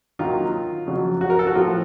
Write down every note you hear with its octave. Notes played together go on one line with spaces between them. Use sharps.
D#2 D#3 F#3 F4
F2 C#3 F#3
F#4
A#4
A4
F#4
A2 F3 F4